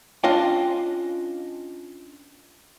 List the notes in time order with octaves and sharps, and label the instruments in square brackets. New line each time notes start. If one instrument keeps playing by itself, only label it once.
[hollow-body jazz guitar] C#4 D4 F4 D#5 F5 G5